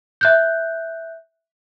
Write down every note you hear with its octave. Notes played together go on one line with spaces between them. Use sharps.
E5 F#6 G6